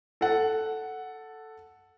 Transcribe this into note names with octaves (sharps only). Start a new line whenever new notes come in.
A4 F#5